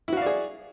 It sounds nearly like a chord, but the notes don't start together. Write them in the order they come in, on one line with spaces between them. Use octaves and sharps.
E4 F#4 F5 D5 G#4